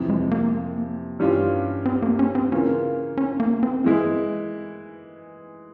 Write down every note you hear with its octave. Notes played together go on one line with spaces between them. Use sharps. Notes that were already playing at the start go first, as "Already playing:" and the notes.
Already playing: F2 C3 E3
G#3
A#3
G2 E3 G3 C#4 F4
C4
A#3
C#4
C4
C#3 E3 A#3 C#4 F4
C#4
A#3
C4
E3 G#3 E4